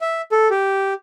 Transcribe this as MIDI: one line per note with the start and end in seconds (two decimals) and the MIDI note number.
0.01 0.21 76
0.32 0.48 69
0.51 0.93 67